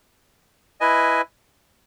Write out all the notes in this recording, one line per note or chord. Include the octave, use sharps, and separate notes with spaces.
E4 B4 D#5 G#5